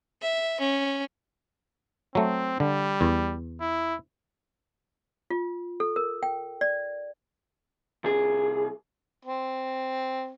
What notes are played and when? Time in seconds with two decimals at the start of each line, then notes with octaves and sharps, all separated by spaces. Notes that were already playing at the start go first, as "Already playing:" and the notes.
0.22 E5
0.60 C#4
2.15 F#3 A3 C4
2.60 D3 G3
3.01 E2
3.61 E4
5.30 F4
5.80 A4
5.96 A#4
6.23 G5
6.61 D5
8.04 C2 G#4
9.25 C4